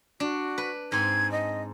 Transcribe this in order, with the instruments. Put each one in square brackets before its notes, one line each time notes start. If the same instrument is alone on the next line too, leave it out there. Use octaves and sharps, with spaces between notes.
[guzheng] D4 [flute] F#4
[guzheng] B4
[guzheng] G#2 C4 G#5 [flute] G#6
[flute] D#5